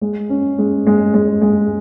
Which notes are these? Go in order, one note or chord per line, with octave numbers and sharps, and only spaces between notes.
G#3
C#4
G#3
G#3
G#3
G#3